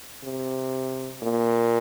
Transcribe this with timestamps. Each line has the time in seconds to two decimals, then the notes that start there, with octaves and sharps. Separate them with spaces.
0.24 C3
1.23 A#2